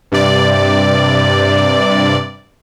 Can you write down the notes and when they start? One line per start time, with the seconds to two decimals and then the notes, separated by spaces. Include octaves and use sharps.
0.12 G2 C3 D5